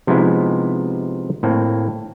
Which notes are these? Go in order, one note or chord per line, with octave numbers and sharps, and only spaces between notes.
C3 F3 G#3 B3 D#4 E4
A2 A#3 C4